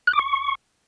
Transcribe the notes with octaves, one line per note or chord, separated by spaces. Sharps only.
F#6
D6
C#6